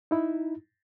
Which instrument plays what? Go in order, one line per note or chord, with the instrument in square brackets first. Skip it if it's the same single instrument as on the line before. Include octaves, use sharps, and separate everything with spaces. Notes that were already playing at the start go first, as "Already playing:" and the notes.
[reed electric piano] D#4 E4